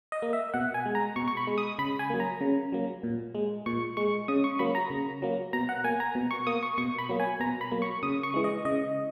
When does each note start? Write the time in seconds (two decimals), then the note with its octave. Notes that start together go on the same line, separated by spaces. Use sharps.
0.12 D#5
0.22 A#3
0.33 E5
0.54 B2 F#5
0.74 G#5
0.86 G#3
0.95 A#5
1.16 B2 C#6
1.28 C#6
1.37 B5
1.47 G#3
1.58 D#6
1.79 C#3 B5
1.99 G#5
2.10 F#3 A#3
2.20 A#5
2.41 C#3
2.72 F#3 A#3
3.03 A#2
3.35 G#3
3.66 A#2 C#6
3.97 G#3 C#6
4.28 C#3 D#6
4.44 C#6
4.59 F#3 A#3 B5
4.75 A#5
4.90 C#3
5.22 F#3 A#3
5.53 B2 A#5
5.69 F#5
5.84 A#3 G#5
6.00 A#5
6.15 B2
6.31 C#6
6.47 A#3 D#6
6.63 C#6
6.78 B2 C#6
6.98 B5
7.09 F#3 A#3
7.20 G#5
7.40 B2 A#5
7.61 B5
7.71 F#3 A#3
7.82 C#6
8.03 C#3 D#6
8.23 C#6
8.34 E3 G#3
8.44 D#5
8.65 C#3 D#5